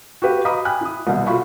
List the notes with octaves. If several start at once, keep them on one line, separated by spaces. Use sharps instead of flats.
F#4 G4 B4 F5
D#5 F5 A#5 B5 D6 D#6
G5 G#5 B5 F#6
E4 D#6
C2 B2
F4 F#4 A4 F5 B5 C#6